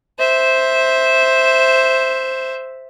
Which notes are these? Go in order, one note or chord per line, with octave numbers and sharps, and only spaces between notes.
C5 E5